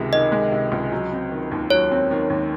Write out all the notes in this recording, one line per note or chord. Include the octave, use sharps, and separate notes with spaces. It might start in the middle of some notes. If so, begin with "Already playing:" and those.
Already playing: C#2 C3 D#3 G#3
D#3 D#5
G#3
C3
C#2
F#3
C4
D#3
D#2
F#3 C#5
C4
D#3
D#2